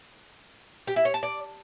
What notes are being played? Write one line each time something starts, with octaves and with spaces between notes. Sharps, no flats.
G4
E4
C#5
A5
D5